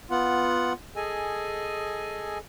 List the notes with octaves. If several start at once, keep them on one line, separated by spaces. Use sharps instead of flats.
B3 F4 F#5
G#4 A4 D#5 G#5